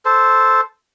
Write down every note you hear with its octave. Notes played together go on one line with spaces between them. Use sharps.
A4 C5